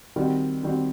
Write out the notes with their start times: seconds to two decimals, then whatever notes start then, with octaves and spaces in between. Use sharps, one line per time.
0.16 D#3 G3 C4 F#4
0.63 D#3 G3 C4 F#4